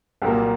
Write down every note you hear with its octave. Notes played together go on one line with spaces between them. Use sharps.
C2 A#2 F#3 A#3 G4